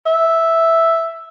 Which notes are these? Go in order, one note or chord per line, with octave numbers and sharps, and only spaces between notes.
E5